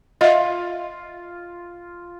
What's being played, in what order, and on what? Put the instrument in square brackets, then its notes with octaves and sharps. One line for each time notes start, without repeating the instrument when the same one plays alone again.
[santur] F4 [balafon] D#5 E5